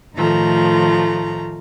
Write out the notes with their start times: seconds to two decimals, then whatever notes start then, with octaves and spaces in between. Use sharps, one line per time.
0.16 A2 D#3 F3 A3 A#5